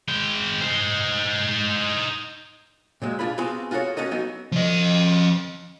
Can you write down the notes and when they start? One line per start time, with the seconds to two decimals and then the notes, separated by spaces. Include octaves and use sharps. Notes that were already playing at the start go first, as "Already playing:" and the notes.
0.09 G#3 G5
0.61 D#4 C5
3.02 A#2 F#3 G#3
3.19 D4 F4 G#4 B5
3.38 B3 C4 F4 F#4 G#4
3.71 F4 F#4 G#4 A4 C#5
3.97 C#4 F#4 A4 D#5
4.11 F#3 B3 D#4 D#5
4.52 F3 D#5